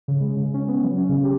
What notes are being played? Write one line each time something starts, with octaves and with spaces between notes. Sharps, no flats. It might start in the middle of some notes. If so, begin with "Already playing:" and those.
C#3
G#3
C#3
C#4
B3
F#3
C#4
C#3
G4